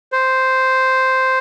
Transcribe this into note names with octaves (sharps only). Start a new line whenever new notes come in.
C5